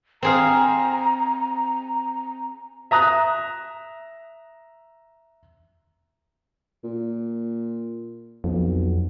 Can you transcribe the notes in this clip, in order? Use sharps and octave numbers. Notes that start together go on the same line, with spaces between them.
C4 G#4 F5 A#5
E5 A#5 D#6 F#6
A#2
B1 F2